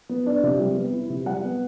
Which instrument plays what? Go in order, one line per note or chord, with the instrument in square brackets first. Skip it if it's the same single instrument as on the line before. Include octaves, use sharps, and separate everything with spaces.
[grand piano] B3
D4
C3
G3
B3
E4
C3
G3 F#5
B3